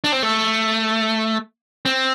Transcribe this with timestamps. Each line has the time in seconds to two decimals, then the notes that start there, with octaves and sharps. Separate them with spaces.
0.04 D4
0.12 C4
0.23 A3
1.85 C4